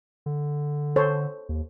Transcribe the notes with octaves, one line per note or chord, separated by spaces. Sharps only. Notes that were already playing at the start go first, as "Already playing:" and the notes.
D3
A4 C5 C#5
D#2